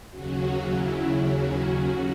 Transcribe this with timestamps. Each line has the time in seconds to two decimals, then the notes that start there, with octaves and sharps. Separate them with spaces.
0.11 D#2 C#3 F#3 C#4 F#4
0.65 E4
1.19 F#4
1.72 F#4